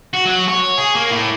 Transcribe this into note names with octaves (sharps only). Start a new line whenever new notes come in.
F#4
F#3 F#4
C#5
G#4
A#3
A2